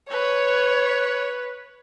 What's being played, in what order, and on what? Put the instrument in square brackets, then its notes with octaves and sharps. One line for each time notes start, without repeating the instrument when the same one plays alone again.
[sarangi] B4 [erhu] C#5